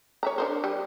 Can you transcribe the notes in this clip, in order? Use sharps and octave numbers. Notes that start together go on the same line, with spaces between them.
C#5 E5 A#5
D4 A#4 C5
G3